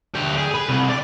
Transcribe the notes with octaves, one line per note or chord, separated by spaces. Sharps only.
D2 G4
G#4
B4
C2
D5